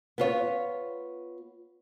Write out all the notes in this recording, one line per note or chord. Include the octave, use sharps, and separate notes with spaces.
B3 F4 C#5